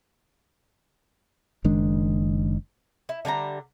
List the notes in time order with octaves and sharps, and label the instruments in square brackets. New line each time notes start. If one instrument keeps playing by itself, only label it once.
[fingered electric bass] F#1 D#3 G#3 D4
[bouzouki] E4
D3 G3 G#5 A#5